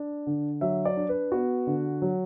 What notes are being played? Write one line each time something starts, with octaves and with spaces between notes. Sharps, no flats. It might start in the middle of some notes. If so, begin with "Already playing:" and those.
Already playing: D4
D3
F#3 E5
D5
D4
B4
B3 F#4
D3
F#3